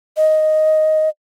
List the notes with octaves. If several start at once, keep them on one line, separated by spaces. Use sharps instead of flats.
D#5